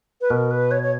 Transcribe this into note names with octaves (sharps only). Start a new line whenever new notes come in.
B4
B2 A#4
B4
C#5
C#5